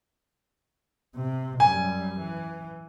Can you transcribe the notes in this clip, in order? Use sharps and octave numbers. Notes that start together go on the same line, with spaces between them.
C3
F#2 G3 G#5
E3